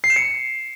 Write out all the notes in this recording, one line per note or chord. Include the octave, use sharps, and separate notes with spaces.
C7
E7
C#7